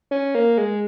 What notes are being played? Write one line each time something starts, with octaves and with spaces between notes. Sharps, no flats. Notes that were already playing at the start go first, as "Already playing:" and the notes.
C#4
A#3
G#3